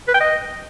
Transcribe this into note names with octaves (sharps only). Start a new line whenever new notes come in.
B4
G5
D#5